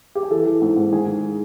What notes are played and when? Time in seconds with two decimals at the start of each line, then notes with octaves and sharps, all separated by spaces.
0.15 G4
0.23 G#4
0.31 E3 A4
0.46 E3
0.62 G#2
0.77 G#2
0.93 D#3 G#4
1.07 D#3